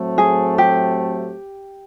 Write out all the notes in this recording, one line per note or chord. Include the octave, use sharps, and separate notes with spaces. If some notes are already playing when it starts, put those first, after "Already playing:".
Already playing: A2 F#3 A3 C4
G#4
G4